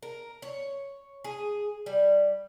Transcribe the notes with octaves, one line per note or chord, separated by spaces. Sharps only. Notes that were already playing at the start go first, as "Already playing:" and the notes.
A#4
C#5
G#4
G3